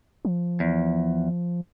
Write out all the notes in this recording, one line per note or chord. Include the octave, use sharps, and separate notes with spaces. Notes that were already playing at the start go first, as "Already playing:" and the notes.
F3
E2